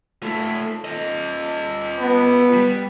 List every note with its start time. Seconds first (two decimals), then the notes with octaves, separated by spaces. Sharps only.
0.23 A3 F4
0.85 F4 D#5
1.99 B3
2.53 G3